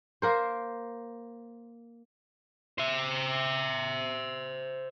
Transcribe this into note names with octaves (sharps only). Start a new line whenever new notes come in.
A#3 A#4 C5
C5 E5